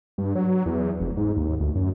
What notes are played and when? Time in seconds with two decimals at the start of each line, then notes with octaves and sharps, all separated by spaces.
0.18 G2
0.35 F#3
0.66 E2
1.00 F1
1.17 G#2
1.36 D#2
1.60 D2
1.75 F#2